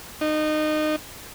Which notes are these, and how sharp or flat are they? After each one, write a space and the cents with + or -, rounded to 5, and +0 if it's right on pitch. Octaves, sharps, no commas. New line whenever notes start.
D#4 -25